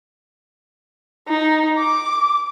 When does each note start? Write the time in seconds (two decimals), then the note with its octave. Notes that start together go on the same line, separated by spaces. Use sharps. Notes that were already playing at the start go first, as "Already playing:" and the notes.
1.28 D#4
1.79 D6